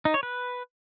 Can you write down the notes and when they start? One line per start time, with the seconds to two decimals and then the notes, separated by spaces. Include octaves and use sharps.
0.05 D#4
0.14 C#5
0.23 B4